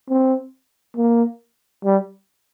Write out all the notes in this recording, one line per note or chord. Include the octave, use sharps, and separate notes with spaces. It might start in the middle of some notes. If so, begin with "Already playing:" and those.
C4
A#3
G3